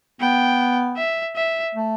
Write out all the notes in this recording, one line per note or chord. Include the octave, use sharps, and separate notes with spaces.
B3 G5
E5
E5
A3